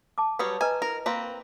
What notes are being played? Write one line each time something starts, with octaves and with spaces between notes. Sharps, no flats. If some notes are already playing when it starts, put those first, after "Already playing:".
A5 D6
F#3 G3 B4 C#5 C#6 D#6
B4 D#5 G#5 A#5
E4 A#4
A#3 C4 B4